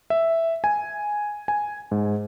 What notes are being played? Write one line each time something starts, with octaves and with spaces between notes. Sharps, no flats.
E5
G#5
G#5
G#2